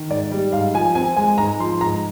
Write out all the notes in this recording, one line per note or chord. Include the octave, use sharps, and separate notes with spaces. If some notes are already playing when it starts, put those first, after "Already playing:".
Already playing: D#3
G#2 D5
G3
G#2 F5
F3 G#5
C4 G#5
G#3 G#5
G#2 A#5
F3 C6
G#2 A#5